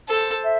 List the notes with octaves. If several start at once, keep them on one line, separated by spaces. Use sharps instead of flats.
A4 C5
E5